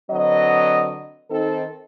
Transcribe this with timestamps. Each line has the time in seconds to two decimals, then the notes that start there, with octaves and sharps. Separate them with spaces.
0.11 D3 F#3 C4 B4 D#5
1.31 D#3 C4 D#4 A4